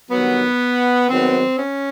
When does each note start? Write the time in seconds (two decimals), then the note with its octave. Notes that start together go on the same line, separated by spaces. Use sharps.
0.11 G2 D#3 F#3 B3
1.08 G#2 D#3 F#3 B3 C4
1.59 C#4